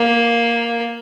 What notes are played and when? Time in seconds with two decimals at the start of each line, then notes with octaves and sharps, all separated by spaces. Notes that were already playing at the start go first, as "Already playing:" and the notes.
Already playing: A#3